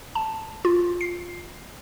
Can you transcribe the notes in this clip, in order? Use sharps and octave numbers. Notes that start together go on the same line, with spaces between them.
A5
F4
C7